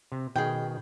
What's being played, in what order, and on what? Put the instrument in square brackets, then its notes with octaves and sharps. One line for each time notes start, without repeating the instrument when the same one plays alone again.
[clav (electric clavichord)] C3
[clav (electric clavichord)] B2 D#3 [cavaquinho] G#4 G5